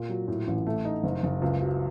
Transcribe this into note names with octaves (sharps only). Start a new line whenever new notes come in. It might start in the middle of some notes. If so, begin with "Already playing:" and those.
Already playing: A#2
F#3
A2
A1
A3
D#4
F#1
F#1
C#2
F#3